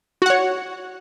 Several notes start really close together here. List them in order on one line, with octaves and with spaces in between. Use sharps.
F#4 F#5 C#5